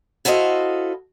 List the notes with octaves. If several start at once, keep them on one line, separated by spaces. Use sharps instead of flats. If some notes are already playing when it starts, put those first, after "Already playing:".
E4 F#4 A4 C5 D#5 F5